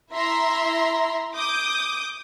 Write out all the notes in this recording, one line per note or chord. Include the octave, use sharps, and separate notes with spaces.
E4 E5 A#5 C6
D6 D#6 G6